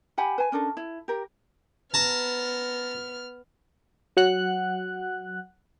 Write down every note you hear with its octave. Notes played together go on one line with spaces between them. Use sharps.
G4 F#5 G#5 B5
B4 G#5
C#4 D4 A4 A#4
E4
G4 A#4
B3 A5 A#5 F6
F#3 F#5 F#6